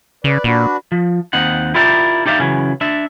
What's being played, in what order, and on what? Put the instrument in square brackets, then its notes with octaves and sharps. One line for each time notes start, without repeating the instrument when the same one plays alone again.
[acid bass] C#3 [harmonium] B4 D5
[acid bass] A#2 [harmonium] D4 F#4 B4
[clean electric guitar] F3
D#2 C4 D#4 F#5
E4 F4 G4 A#4 D5 E5
D#4 G4 D5 E5 F5
C#3 E3 F#3 C#4
D4 E5